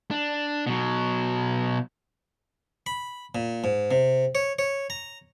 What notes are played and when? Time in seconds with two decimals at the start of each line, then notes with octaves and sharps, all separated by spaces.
0.11 D4
0.67 B2 F#3
2.86 B5
3.35 A#2
3.64 G#2
3.91 C3
4.35 C#5
4.59 C#5
4.90 A#5